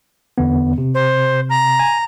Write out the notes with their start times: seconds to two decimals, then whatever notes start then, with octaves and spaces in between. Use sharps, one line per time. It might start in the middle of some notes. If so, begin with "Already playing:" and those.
0.38 E2 D3 B3
0.78 C3
0.94 C5
1.50 A#5
1.79 G#5